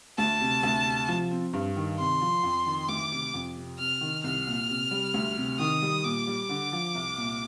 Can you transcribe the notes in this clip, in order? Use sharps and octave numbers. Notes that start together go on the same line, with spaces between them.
D2 A5
C3
D2
C3
F3
C4
G2
D#3
C3 C6
F3
F2
D#3
D2 D6
C3
F2
C3
C3 F6
D#3
C2 F6
A#2
C3
G3
D2
C3
D#3 D#6
G3
A#2 D6
G3
D3
F3
C2
A#2